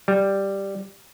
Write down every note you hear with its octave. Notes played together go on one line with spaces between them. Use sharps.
G3